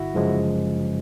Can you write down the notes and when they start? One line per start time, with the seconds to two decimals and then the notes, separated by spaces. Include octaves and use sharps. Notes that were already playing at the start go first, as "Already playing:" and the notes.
Already playing: G1 E4 F#4
0.14 F#2 C#3 F3 G#3